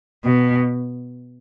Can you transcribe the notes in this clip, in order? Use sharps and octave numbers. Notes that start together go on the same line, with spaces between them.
B2